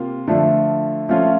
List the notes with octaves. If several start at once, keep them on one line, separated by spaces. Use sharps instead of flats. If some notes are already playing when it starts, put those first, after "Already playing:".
Already playing: C3 A#3 F4
D3 F3 A3
F3 A3 C#4 F4